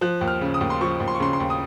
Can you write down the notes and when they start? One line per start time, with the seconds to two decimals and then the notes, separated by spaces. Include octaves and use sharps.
0.01 F3 F#6
0.21 D#2
0.28 F6
0.41 C#3
0.54 D#6
0.61 D#2
0.70 C6
0.81 F3 C#6
1.00 D#2
1.08 C6
1.15 C#6
1.20 C#3 C6
1.33 C6
1.40 D#2
1.50 D#6